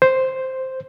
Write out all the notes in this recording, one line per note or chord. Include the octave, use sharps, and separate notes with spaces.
C5